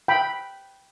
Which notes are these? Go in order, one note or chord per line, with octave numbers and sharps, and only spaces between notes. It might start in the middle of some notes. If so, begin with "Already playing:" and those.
G5 B5